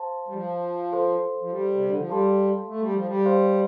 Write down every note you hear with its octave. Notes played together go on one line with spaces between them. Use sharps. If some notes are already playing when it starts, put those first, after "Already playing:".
Already playing: C5 F5 A5 C6
G3
F3
A4 C5 F5 C6
F3
G3
C3
D3
F3
G3 A4 F5 A5 C6
A3
G3
F3
G3
G4 C5 F5 C6